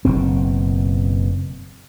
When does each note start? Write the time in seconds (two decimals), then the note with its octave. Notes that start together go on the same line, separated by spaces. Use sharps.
0.05 F#1 B2 C4